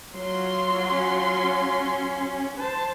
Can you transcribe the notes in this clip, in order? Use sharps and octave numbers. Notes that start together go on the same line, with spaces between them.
F#3 F4 C6
C#4
C5 A5